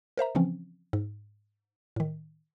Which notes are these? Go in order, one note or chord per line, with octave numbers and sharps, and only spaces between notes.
A#4 C5 E5 A#5
C#3 E3 F3 C4 C#4
G#2
A2 D#3